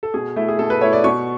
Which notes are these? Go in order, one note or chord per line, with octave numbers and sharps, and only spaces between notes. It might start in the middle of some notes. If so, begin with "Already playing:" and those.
A4
B2 G#4
A3 E4
G#4
B2 A4
B4
A3 E4 C#5
D5
B2 C#6